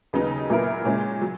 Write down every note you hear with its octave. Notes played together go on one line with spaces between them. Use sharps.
D#2 C#3 F#3 B3 D#4
A#2 F#3 B3 E4 A#4
A#2 G#3 C#4 G#4
F#3